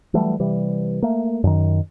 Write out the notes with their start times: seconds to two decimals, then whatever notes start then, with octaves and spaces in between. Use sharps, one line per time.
0.14 E3 F#3 G3 A3
0.40 C3 E3 G3
1.02 A3 A#3
1.44 F#2 D#3